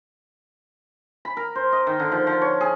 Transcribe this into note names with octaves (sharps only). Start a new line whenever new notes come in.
B5
A#4
C5
D#5
D#3
D3
F3
F3
C#5
G#4